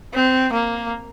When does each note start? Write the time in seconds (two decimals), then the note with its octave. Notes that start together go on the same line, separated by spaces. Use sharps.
0.14 C4
0.54 A#3